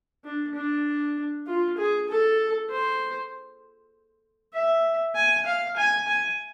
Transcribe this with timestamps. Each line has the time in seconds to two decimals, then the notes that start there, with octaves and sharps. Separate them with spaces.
0.25 D4
0.55 D4
1.47 F4
1.77 G#4
2.09 A4
2.70 C5
4.54 E5
5.15 G#5
5.46 F5
5.77 G#5
6.08 G#5